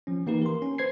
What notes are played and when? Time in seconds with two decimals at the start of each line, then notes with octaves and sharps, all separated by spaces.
0.07 F3 C#4
0.27 E3 A#3 D#4 G4 B4
0.42 A#4 C6
0.62 C#4
0.78 B4 C5 G#6 C7